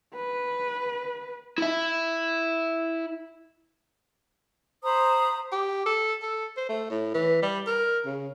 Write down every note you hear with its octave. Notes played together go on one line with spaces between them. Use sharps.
B4
E4 E5
C5 A#5 B5 D#6
G4
A4
A4
C5
A3
A2
E3
G3
A#4
C#3